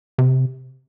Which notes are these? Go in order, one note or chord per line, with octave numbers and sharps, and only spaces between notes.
C3